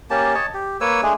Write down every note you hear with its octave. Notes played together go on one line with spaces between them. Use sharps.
A#3 C#4 G4 A5
C#5 D#5 A5
G4
A#3 B4 C#5 E6
G#3 A3 D4 G#4